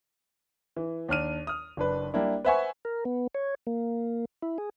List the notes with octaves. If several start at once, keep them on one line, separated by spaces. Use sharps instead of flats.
E3
D#2 D4 F6 D#7
D#6 F6
F#1 D4 B4
G3 A#3 D4 E4
B4 C5 E5 F#5 G#5 C#6
A#4
B3
C#5
A#3
E4
G#4